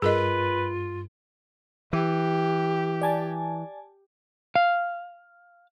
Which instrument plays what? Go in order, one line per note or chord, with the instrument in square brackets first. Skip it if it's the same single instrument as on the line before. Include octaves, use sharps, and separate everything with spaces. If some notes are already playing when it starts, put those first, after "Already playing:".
[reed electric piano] G2 [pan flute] F4 [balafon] G#4 A#4 D#5 [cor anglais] B4
[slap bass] E3 [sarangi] G4
[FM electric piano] D5 G#5 A5
[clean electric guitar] F5